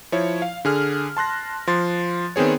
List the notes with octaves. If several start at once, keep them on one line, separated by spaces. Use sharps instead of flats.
F3 E4 C#5
F5
D3 G#4 F6
A5 C6 F#6 A#6
F3 C6 A6
D#3 B3 C4 G#4 C#5